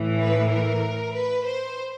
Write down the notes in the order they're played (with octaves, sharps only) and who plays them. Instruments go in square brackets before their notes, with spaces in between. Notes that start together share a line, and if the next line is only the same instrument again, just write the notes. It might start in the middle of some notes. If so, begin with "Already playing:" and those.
Already playing: [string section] A2 E3
B4
A#4
B4
C5